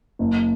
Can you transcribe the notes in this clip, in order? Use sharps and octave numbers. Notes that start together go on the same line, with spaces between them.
F#1